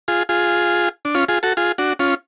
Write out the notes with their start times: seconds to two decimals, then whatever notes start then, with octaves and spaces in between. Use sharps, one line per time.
0.08 F4 G#4
0.29 F4 G#4
1.05 D4
1.15 C#4 F4
1.29 F4 G#4
1.43 F#4 A4
1.57 F4 G#4
1.78 D4 F#4
1.99 C#4 F4